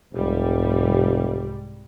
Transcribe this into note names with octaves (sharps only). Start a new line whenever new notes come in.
F1 C2 G#2 G3